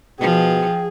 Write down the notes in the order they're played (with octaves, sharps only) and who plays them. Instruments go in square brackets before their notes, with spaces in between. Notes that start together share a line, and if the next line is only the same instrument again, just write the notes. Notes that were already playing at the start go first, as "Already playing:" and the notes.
[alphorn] B2 [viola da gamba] F3 [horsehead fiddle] G#4 [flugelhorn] G5